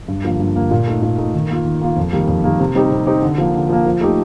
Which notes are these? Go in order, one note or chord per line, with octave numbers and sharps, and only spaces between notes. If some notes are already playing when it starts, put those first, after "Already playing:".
G2
D3 F3 A#3
G2
D3 F3 A#3
A#2
A3 D#4
A#2
A3 D#4
D#3
A#3 F4
D#3
A#3 F4
F2
D#3 G3 A#3
F2
D#3 G3 A#3
C3
G3 C4 D#4 G4
C3
G3 C4 D#4 G4
D3
F3 A#3
D3
F3 A#3
F3
A3 D#4 G4